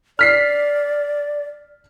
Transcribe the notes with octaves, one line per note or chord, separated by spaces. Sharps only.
D5 F6 B6 C7